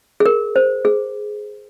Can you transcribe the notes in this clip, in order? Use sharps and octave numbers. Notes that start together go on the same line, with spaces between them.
G#4
A#4
C5
G#4